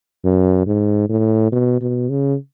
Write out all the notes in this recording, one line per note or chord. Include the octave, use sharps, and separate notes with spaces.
F#2
G#2
A2
B2
B2
C#3